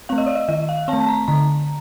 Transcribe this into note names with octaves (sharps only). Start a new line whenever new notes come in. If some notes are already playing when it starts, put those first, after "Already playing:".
A3 C4 F5
D#5
D5
D#5
D#3 D#5
F5
C4 A5
A3
A5
A#5
D3 A#5